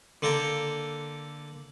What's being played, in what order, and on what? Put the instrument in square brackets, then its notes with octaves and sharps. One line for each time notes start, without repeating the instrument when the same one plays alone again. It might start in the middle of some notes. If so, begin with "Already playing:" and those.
[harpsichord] D3 A#3 A4 G5 A#5